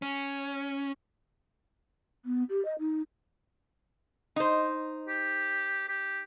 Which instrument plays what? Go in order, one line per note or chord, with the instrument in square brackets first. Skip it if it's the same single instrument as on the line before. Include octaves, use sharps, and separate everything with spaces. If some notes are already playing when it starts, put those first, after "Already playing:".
[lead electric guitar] C#4
[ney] B3
G4
D#5
D#4
[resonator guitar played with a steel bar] D#4 C5
[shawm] G4
G4